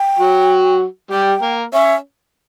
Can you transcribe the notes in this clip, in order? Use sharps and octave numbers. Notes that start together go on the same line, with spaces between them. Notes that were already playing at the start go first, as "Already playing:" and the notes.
Already playing: G5
F#3 F#4
G3 G4 G5
A#3 A#4
C#4 C#5 E5